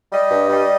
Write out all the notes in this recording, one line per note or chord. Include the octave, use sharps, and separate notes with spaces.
G3 D#5
G2
G3